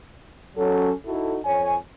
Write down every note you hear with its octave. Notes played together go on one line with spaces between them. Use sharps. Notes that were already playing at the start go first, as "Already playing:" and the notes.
F#3 C#4 A4
D#4 E4 F#4 A4
F2 C#5 G#5